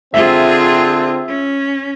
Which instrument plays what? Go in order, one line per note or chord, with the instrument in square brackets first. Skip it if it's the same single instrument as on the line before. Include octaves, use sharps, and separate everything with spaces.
[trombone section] D3 C4 [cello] F4 G#4 [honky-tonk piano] E5
[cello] C#4